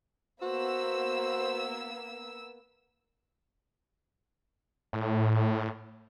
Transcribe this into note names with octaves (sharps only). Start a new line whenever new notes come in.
A#3 B3 F#4 C5 E6
A2